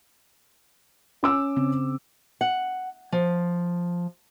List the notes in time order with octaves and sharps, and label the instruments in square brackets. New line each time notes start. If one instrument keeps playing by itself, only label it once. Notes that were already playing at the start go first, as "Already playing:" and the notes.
[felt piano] C#4 D6 E6
[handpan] C#3 C4
[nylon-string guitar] F#5
F3